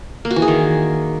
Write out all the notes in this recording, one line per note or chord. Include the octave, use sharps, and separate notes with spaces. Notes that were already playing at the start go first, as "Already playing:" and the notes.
A#3
F#4
E3
G#4
D#3